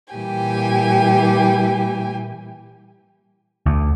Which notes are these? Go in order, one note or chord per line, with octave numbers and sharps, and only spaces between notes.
A#2 E3 G3 G4 G5 G#5
D2